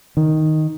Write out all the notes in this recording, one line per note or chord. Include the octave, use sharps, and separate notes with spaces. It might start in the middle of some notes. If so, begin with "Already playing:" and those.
D#3